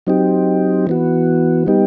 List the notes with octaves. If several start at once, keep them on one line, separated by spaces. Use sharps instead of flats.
F#3 C4 D#4 G4
E3 B3 F#4
G3 B3 D#4 G4